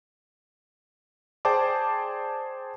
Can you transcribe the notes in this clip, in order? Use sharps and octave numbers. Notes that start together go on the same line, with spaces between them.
G#4 C5 D5 G5 A5 D6